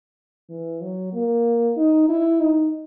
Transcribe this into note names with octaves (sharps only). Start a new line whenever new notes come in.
E3
F#3
A#3
D#4
E4
D#4